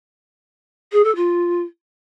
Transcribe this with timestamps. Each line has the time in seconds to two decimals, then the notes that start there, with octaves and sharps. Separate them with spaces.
0.92 G#4
1.04 A4
1.15 F4